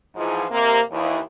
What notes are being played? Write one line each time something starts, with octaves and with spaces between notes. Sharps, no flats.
G#2 E3 F3
C3 A#3
D#2 E3